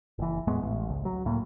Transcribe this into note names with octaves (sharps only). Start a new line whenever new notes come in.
F#1 E3
E2 A2 G#3 B3
A1
C#2
F#3
C#2 A2 A#3